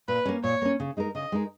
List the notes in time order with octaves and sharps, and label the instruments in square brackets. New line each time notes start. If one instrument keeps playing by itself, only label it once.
[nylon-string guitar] A#2 [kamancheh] B4
[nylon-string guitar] A#3 C#4
[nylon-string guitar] A#2 [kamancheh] C#5
[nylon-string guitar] A#3 C#4
C#3
G#3 D#4 A#4
[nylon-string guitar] C#3 [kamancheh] D#5
[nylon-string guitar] G#3 D#4 A#4